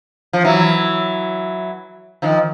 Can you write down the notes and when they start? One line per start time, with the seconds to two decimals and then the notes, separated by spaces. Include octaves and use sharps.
0.33 F3
0.45 E3 F#3
2.22 D#3 F3